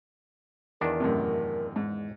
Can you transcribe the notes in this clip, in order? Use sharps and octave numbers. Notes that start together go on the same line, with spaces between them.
E2 D#3 D4 A#4
F#2 A2 C3
G#2